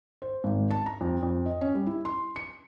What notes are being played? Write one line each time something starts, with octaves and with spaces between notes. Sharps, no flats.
C5
G#1
A5
A#5
F2
F2
D#5
C#4
G3
E4
C6
C#7